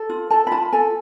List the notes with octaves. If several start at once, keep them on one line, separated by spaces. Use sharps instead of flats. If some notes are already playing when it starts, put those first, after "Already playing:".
Already playing: A4
F4
A4 A5
B5
F4 A5
A4 G#5